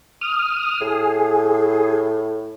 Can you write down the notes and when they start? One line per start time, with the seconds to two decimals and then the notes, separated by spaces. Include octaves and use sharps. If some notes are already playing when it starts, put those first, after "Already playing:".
0.21 D#6 F6
0.81 A2 G#4